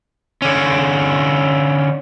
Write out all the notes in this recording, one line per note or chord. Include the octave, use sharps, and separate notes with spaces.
D3 C#4